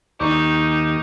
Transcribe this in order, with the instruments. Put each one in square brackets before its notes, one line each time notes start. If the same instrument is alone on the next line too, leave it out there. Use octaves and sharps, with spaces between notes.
[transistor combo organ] D#2 G4 [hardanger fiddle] D#4 [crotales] C#6 D6